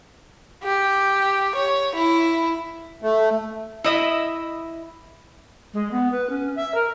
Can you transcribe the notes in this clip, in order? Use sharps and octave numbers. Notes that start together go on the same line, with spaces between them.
G4
C#5
E4
A3
E4 D#5 E5
G#3
B3
B4
C#4
E5
A#4